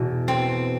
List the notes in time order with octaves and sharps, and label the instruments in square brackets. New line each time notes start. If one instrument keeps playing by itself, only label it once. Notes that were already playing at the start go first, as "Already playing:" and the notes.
Already playing: [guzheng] E2 B2
C4